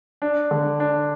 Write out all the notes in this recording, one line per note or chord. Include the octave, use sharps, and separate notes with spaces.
D4
D3
D4